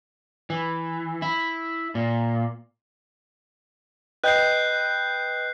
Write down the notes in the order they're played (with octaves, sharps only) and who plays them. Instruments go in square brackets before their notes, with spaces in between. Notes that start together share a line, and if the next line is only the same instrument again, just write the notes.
[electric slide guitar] E3
E4
A#2
[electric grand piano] B4 D#5 G5 [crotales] F#6 G6 C7